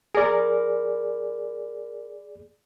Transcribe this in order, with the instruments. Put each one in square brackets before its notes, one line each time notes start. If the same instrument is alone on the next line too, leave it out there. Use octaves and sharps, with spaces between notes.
[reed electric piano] G#4 D5 [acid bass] A#4